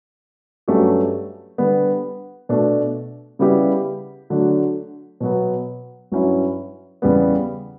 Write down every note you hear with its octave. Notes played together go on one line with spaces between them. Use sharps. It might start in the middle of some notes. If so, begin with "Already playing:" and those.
G2 F#3 A3 C#4 G4
D3 G3 B3
B2 A3 D4
C#3 G3 B3 E4 G4
D3 F#3 A3 D4 F#4
B2 F#3 B3
G2 F#3 C#4 E4
E2 C#3 G3 B3